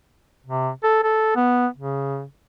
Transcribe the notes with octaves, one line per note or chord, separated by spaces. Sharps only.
C3
A4
A4
B3
C#3